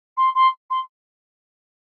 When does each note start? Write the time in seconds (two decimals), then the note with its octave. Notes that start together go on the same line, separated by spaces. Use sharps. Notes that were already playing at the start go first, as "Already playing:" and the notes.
0.17 C6
0.34 C6
0.70 C6